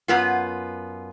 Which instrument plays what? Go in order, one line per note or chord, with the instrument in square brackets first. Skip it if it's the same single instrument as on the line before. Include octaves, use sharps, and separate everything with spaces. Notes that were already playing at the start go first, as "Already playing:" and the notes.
[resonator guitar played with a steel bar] F#2 B3 F4